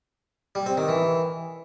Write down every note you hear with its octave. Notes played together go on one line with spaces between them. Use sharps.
G3
C4
D#3
E3